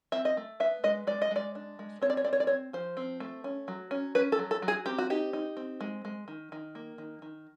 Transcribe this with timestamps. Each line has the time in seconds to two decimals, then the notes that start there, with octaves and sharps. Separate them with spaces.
0.12 C4 E5
0.25 D#5
0.37 A3
0.60 B3 E5
0.84 G#3 D#5
1.07 G#3 D5
1.22 D#5
1.31 G#3 D5
1.55 D4
1.79 G#3
2.02 C4 C#5
2.10 D5
2.17 C#5
2.24 C4 D5
2.33 C#5
2.40 D5
2.47 C4 C#5
2.73 F3 C5
2.97 C4
3.20 A3
3.44 C#4
3.68 F#3
3.91 C#4
4.15 C#4 B4
4.32 A4
4.39 F#3
4.51 A4
4.62 F#3
4.68 G#4
4.86 C4 G4
4.98 F#4
5.10 D#4 G4
5.33 D#4
5.57 C4
5.81 G#3
6.05 G#3
6.28 D#3
6.52 D#3
6.75 A#3
6.98 D#3
7.22 D#3